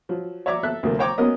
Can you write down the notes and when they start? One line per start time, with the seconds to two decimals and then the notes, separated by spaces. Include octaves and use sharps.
0.09 F3 F#3
0.46 C#5 D5 E5 A#5 C#6 D6
0.63 A4 E5 F#6
0.83 D2 C3 F#3 A3 A#3
0.99 C5 C#5 G5 A#5 C#6 D6
1.18 F#3 B3 C#4 A#4 D#5